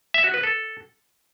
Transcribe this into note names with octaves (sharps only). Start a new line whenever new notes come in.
E5
F#4
B4
A4